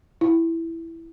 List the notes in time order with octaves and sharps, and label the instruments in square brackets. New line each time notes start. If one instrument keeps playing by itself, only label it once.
[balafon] E4